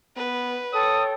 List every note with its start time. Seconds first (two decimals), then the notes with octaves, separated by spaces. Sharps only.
0.16 B3 B4
0.73 A4 C#5 G5 D#6